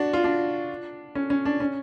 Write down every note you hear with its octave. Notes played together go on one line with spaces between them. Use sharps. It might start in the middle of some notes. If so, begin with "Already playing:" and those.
Already playing: D4 F#4
F4
D4
C#4
C#4
D4
C#4